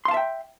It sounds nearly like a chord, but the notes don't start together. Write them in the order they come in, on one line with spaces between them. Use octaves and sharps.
C6 F5 A5 E5 G5